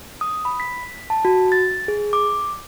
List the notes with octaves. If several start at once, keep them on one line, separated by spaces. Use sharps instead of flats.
D#6
B5
B6
A5
F#4
A6
G#4
D6